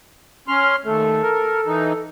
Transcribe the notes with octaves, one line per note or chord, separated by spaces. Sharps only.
C#4 C6 F6
D#2 A3 A4
A#4
E3 D#4